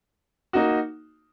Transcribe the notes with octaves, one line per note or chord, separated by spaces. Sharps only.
A#3 D#4 F#4